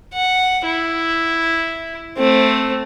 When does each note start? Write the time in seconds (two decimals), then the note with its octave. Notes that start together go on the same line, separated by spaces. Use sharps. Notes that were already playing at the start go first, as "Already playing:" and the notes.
0.14 F#5
0.66 E4
2.17 A3 C4